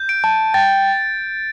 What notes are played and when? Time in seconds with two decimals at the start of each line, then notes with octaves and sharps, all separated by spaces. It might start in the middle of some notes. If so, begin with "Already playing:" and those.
Already playing: G6
0.09 D7
0.24 A5
0.54 G5 A6